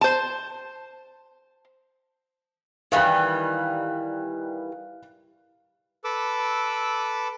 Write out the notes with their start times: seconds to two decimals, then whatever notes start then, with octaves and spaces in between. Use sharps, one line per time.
0.01 C5 A5
2.92 D#3 E3 G3 F5 F#6
6.04 A4 B4 D6 E6